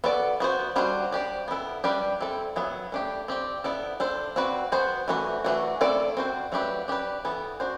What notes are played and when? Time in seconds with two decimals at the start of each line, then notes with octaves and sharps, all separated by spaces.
0.04 B3 F#4 A4 D5
0.40 B3 F#4 C5
0.76 G3 D4 F#4 C5
1.12 D4 G4 D5
1.48 B3 E4 A4
1.84 G3 D4 G4 B4 D5
2.20 C4 E4 A4
2.56 F#3 B3 E4
2.92 A3 D4 G4
3.28 C4 G4 D5
3.64 B3 E4 A4 D5
4.00 D4 A4 C5
4.36 C4 F#4 B4 D5
4.72 B3 F#4 C5
5.08 E3 A3 D4 F#4 B4
5.44 E3 A3 D4 F#4
5.81 A3 C4 E4 A4 D5
6.17 C4 F#4 C5
6.52 F#3 A3 D4 G4 B4
6.88 D4 G4 B4 D5
7.25 E3 B3 E4 A4
7.60 D4 F#4 C5